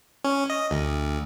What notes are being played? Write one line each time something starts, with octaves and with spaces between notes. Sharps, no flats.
C#4
D#5
D2